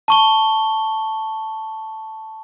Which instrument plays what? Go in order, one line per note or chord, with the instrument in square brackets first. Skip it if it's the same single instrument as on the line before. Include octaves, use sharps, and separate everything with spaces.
[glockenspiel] A5 C#6 G7